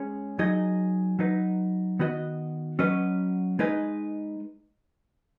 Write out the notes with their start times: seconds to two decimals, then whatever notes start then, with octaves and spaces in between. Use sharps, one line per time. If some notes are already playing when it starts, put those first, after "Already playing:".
Already playing: G#3 C#4 G#4 C#5
0.39 F#3 D#4 G#4 D#5
1.19 F#3 D#4 B4
1.99 D#3 B3 F#4 D#5
2.79 F#3 C#4 F#4 B4 D#5
3.59 G#3 D#4 B4 D#5